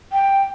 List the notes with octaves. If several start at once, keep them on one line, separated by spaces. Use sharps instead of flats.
G5